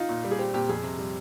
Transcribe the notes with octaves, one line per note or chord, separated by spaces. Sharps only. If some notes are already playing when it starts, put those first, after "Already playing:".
Already playing: D#4 F4
A#2
G3
G#4
C4 G4
A#2 G4
F2 G#4
C3
G3